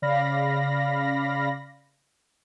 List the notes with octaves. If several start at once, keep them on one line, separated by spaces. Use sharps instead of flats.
C#3 D5 F5 B5 A#6